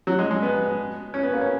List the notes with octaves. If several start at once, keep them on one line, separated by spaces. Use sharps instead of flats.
F#3
G#3
G#3
B3
C#4
B3
A#3
C#4